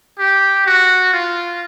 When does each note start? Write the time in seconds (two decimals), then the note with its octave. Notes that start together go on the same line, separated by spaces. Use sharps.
0.19 G4
0.66 F#4
1.14 F4